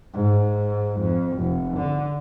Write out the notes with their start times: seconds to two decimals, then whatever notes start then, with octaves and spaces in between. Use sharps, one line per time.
0.14 G#2
1.00 F2
1.38 F1
1.77 D3